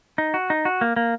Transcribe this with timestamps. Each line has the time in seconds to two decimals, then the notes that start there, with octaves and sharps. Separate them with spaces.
0.18 D#4
0.34 F#4
0.50 D#4
0.65 F#4
0.81 A#3
0.96 A#3